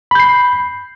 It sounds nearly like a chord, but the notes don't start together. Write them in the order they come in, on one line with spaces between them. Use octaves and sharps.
B5 G6 C7